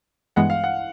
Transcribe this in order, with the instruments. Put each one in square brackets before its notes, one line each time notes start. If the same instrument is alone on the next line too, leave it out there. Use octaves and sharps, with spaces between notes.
[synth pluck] G2 E3 G#3 B3 [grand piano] F#5
[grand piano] F5
F#5